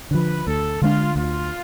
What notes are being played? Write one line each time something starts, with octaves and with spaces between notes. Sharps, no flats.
D3 F3 B4
D2 A4
D3 G#3 D4 F4
D2 F4